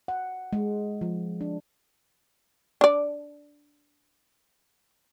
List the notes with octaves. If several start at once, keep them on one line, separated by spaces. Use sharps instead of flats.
F#5
G#3
F3
D4
D4 D5